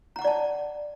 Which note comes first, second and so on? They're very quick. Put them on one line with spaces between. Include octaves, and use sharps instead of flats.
A#5 F#5 D6 D5 A5